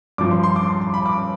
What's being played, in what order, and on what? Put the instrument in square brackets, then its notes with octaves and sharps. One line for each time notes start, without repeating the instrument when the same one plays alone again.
[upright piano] G2 F3 D6
C6
C6
D6
C6
C6
B5
D6